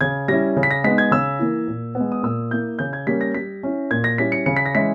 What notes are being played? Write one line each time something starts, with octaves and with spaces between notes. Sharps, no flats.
C#3 G#6
G3 C#4 E4 A#6
C#3
B6
A#6
G#3 B3 D#4 B6
G#6
C#3 E6
E3 A#3
A#2
B3
G#3
D#6
A#2 E6
A#3 E4 G6
C#3 G6
G#6
G3 A#3 C#4 B6
A#6
G3 B6
C#4 E4
A#2 G#6
A#6
G3 C#4 E4 B6
C#7
C#3 C#7
B6
A#6
E3 G#3 C#4 E4 B6